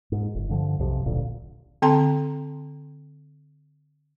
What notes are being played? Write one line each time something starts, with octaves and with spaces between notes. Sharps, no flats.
G#2
G1
G2 D3 F3
B1 F2 C3 F3
D1 A1 A#2 D3
D3 C4 G5 A#5 C6